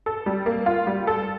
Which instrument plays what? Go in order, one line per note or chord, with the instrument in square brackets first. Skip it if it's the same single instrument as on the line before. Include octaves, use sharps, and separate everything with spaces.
[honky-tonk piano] A4
G3
A#3
F4
G3
A4